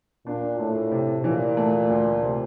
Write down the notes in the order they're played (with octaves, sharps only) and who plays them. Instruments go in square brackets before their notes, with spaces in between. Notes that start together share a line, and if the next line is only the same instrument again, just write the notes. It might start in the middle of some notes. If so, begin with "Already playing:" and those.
[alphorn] A#2 [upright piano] D4
[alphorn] A2 [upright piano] A3
[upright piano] C3
[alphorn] A#2 [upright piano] E3
[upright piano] A3
D2
C3